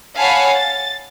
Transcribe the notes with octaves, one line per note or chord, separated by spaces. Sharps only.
C#5 F5 F#5 G#5 A5 B5
A6